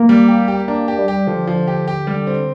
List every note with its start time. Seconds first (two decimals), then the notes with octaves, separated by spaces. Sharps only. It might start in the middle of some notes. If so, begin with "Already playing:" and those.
Already playing: A#3
0.09 G3
0.28 G4
0.48 G4
0.68 A#3 D4
0.88 G4
0.99 G3
1.08 G4
1.27 D3 F3
1.47 F3
1.68 G4
1.88 G4
2.07 G3
2.27 C4